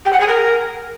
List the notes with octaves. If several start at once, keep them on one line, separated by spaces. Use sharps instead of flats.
G4
F#5
G#4
A#4